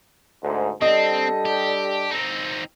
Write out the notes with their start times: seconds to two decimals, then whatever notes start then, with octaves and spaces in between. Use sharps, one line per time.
0.43 D2 G#2
0.82 G3 C4 D4 A4 D#5
1.45 G4
2.11 C4 D#4